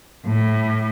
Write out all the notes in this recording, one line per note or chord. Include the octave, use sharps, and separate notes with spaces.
A2